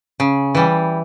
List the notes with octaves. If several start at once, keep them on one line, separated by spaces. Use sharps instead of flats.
C#3
E3 G3